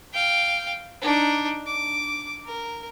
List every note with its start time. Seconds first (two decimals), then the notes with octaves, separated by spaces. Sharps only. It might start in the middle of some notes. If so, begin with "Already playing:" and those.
0.13 F5 G5
1.02 D4 D#4
1.67 D6
2.46 A#4